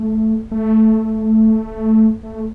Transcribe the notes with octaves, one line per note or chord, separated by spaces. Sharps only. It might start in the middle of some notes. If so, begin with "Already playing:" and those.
Already playing: A3
A3
A3